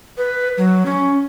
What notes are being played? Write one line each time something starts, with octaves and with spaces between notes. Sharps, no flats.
B4
F#3
C#4